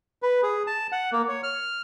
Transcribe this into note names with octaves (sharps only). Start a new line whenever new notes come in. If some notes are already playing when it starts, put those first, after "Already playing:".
B4
G#4
A5
F#5
A#3
C#5
F6